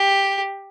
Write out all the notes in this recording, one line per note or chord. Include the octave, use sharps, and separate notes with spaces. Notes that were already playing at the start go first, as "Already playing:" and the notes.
Already playing: G4